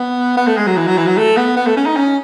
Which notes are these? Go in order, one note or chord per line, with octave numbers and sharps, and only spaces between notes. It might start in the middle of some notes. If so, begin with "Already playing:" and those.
Already playing: B3
B3
A3
G#3
F#3
E3
F#3
E3
F#3
A3
B3
B3
A3
C#4
D#4
C#4